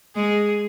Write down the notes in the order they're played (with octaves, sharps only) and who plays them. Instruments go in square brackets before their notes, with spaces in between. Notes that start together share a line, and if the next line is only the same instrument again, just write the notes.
[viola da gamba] G#3 [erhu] G#4